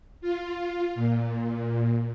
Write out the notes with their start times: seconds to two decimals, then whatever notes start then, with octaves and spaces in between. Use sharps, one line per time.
0.21 F4
0.95 A#2